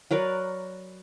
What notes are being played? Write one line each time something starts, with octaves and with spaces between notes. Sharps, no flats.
F#3 A#4 B4 D5